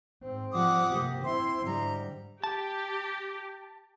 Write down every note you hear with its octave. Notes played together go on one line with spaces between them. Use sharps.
G#2 C4
F3 G3 F#5 D6 D#6
G1 C3 A#3 G4
C4 E4 E5 C6
G#2 D3 G3 A#5
G4 A5